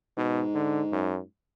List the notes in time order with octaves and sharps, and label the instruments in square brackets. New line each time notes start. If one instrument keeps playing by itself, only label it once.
[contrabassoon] G#2 [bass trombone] B2
[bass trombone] D3
F#2